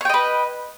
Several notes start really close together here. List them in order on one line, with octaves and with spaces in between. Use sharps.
C#5 G5 D#5 B4